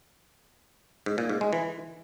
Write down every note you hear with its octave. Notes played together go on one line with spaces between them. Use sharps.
G#2
A#2
G#2
G#3
E3